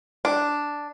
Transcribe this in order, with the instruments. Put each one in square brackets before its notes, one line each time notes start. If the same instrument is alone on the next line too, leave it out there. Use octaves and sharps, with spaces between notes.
[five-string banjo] D4